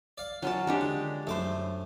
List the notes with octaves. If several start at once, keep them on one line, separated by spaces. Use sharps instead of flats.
D5 F5
F#3 C#4 F4 A5
G#3 D4 G4
D3
F#2 A3 C5 D6